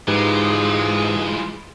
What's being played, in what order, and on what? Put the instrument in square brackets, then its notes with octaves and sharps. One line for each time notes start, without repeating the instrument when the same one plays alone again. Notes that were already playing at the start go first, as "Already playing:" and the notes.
[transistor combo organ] G#2 [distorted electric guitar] E3 F4 [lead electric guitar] G#3 [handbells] D#4 G4 B4